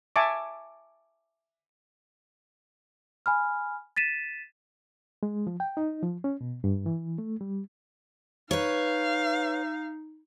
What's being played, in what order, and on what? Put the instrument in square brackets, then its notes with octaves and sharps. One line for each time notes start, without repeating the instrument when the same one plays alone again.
[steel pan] E5 G#5 A5 C#6 D6
[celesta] G#5 B5 F6
A6 B6 D#7 E7
[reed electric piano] G#3
F3
G5
D#4
F3
C#4
B2
G2
E3
A3
G3
[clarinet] D#4 [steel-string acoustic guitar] B4 C#5 [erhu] F5